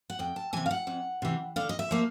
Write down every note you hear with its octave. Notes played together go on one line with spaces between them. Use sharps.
F#5
F2 G5
A5
C3 E3 G#5
F5
F#5
F2
C3 E3
D3 F5
D#5
E5
F3 A#3